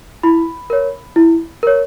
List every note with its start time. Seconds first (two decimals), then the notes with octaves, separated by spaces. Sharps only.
0.23 E4 B5
0.70 A#4 C#5
1.16 E4
1.63 A#4 C#5